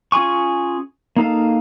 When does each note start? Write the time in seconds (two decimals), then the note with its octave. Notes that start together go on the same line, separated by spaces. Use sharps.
0.12 C#4 F4 G#4 G#5 C#6
1.16 A#3 D#4 A4 F5